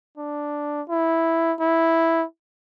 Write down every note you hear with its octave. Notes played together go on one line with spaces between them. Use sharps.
D4
E4
E4